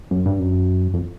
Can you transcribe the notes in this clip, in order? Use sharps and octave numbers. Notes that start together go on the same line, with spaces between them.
F#2
G2
F#2
F2